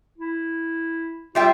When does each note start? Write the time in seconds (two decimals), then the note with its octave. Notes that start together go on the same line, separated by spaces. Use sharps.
0.18 E4
1.35 G3 F4 E5 G5